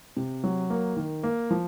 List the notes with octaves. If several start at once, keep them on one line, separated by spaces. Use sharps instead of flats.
C3
F#3
A#3
D#3
A#3
F3